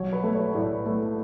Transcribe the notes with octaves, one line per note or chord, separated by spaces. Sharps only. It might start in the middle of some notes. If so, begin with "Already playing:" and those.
Already playing: B1 F#3 C#5
B4
A3
C#5
A2 D5
A3